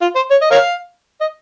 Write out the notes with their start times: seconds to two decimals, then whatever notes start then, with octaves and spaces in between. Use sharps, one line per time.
0.01 F4
0.16 C5
0.31 C#5
0.41 D#5
0.51 A#4 C#5 F5
1.21 D#5